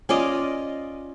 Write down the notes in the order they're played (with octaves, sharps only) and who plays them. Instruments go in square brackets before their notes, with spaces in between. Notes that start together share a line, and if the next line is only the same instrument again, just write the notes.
[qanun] C#4 F4 D5 D#5